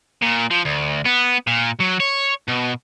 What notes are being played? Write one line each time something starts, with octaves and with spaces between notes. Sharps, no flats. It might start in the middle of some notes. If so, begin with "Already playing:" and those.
A#2
F3
D2
B3
A#2
F#3
C#5
B2